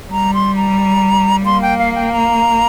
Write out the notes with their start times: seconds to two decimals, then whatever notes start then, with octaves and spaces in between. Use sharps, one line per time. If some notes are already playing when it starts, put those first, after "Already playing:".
0.11 G3 A#5
0.34 C6
0.56 A#5
1.45 A#3 C6
1.62 G5
1.78 F5
1.95 G5
2.12 A#5